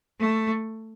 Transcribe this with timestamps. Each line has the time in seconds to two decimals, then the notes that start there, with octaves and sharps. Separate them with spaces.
0.20 A3